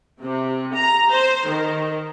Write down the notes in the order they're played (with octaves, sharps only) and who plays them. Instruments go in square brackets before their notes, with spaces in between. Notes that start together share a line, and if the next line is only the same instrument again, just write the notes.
[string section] C3
A#5
C5
D#3